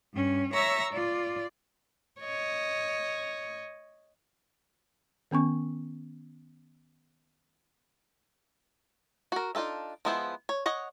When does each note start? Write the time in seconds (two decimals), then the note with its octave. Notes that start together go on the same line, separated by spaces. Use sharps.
0.13 G2 C#4
0.52 C#5 E5 A#5 C#6 E6 A#6
0.92 F4 D5
2.20 C#5 D#5
5.31 D#3 B3 C#4 C#6
9.32 F#4 A#4
9.55 D4 D#4 F4 A4 E5
10.05 F3 G#3 B3 E4 C5
10.49 C#5
10.66 C#5 D#5 F#5